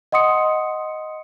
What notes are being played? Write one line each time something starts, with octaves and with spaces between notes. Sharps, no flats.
D#5 F#5 C6 D#6 C#7